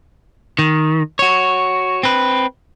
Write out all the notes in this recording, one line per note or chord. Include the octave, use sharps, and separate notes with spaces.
D#3
F#4 C#5
C4 B4